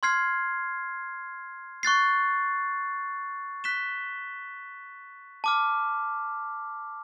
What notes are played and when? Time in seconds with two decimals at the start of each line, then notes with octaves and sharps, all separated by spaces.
0.03 C6 F6 G#6 C7
1.83 C#6 F#6 A6 C7
3.64 F#6 B6 E7 G7
5.44 A5 D6 F6